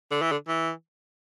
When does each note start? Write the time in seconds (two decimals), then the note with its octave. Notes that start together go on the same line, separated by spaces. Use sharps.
0.11 D3
0.22 E3
0.32 D3
0.48 E3